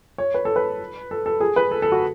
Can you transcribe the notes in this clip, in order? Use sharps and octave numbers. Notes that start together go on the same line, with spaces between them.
C#5
B4
A4
B4
A4
A4
G#4
B4
A4
A4
F#4